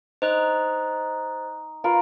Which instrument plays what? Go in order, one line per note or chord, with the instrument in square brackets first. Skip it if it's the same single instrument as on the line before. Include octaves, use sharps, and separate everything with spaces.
[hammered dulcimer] D#4 [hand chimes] C5 D#5 F#6
[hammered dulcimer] F4 A#4 B4